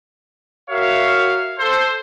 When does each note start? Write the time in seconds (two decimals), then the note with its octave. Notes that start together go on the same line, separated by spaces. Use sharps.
0.70 F#4 A#4 C#5 E5 F5
1.58 A4 C5